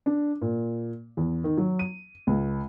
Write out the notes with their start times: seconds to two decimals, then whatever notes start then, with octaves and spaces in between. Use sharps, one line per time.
0.06 D4
0.41 A#2
1.17 E2
1.44 D#3
1.57 F#3
1.79 D#7
2.27 C#2